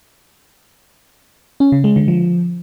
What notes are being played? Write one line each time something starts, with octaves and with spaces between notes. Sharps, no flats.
C#4
C#3
G#3
D3
F3